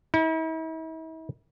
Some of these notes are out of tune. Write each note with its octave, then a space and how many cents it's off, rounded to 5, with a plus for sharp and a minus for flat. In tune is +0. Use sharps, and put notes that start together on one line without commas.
E4 -45